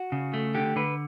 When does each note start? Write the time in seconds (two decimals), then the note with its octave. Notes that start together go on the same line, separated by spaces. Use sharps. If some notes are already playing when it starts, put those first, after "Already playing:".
Already playing: F#4
0.12 C#3
0.34 A3
0.54 D3 G4
0.76 D3 B4